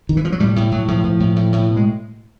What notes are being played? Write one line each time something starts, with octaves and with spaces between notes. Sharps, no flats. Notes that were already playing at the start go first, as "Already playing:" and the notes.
D#3
E3
F3
F#3
A2 G3
A2
A2 F#3
A2 F3
A2 F3
A2
A2
A2
B2
G#3